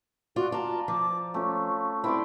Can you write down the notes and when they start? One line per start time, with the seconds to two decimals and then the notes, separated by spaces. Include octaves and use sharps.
0.36 F4 F#4 D5
0.52 F4 D5 A5 A#5
0.88 F3 D6
1.34 A3 C#4 F4
2.04 C4 E4 C5 D5